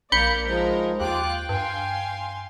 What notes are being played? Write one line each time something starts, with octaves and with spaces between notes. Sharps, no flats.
A#1 A#3 A#4 D5 B5 G6 C#7
F3 G#3 D#4 A#4
D#2 F4 G5 D6 F#6
G2 F5 G#5 C6